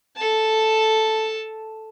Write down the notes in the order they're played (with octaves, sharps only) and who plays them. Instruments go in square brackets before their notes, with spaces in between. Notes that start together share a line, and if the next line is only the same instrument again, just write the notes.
[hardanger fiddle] A4 A5